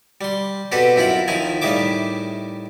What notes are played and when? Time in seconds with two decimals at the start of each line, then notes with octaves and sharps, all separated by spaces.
0.21 G3 C6
0.72 B2 C4 G4 A4 B4
0.96 F#2 C4 E4 F4 B5
1.28 D#2 D#3 F3 E4 G#5
1.61 A2 D#3 G3 G#4 E5 D6